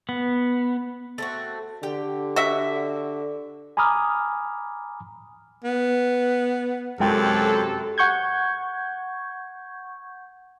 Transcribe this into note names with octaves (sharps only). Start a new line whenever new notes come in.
B3
A3 C4 F#4
D3 G4 G5
F#4 E5
G#5 A#5 B5 D6 D#6 F6
B3
F#2 C3 G#3 G4 A4 G5
F#5 C#6 G6 G#6